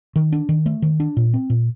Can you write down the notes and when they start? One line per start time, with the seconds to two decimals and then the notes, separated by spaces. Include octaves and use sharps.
0.16 D#3
0.32 D4
0.49 D#3
0.66 A3
0.82 D#3
1.00 D4
1.17 A#2
1.34 C4
1.50 A#2